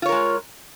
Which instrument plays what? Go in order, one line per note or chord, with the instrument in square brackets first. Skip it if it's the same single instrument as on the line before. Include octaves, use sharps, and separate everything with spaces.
[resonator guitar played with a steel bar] F4
C#5
A#4
G#3